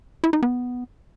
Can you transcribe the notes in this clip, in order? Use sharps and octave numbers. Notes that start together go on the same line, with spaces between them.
E4
D#4
B3